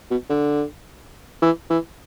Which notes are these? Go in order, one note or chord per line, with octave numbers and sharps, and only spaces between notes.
B2
D3
E3
E3